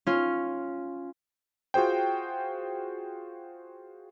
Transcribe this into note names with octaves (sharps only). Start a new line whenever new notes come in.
C#4 F4
F4 F#4 G#4 C5 G5